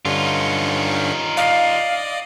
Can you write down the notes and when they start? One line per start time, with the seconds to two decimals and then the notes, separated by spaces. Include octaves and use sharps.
0.05 G2 D3 C#4 D#4 F4
1.37 D5 D#5 F5